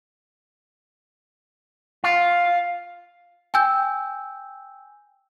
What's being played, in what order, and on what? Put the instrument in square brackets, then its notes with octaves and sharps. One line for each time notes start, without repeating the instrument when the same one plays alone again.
[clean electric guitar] F4 [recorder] F5
[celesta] G5 G#5 E6 G6